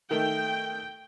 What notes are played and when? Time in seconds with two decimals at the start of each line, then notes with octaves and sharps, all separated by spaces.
0.11 D#3 A3 G5